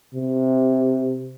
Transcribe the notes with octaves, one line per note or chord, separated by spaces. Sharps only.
C3